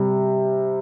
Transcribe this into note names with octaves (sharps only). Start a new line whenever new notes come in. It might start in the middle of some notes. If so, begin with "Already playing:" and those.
Already playing: C3 G3